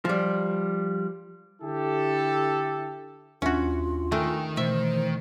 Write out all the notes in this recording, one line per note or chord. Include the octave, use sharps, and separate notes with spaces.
F3 G3
D3 E4 G4 A4
D#2 C#4 D4 F4 F#4 E5
D#3 A3 G5 G#5
B2 E3 A3 C5 E5